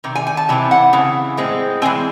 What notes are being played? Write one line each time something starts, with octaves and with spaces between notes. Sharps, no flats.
C3 D#3
G#5
G#5
A5
C3 E3 C4
F#5
C#3 E3
A2 G#3 C4
E3 G#3 C4 G#5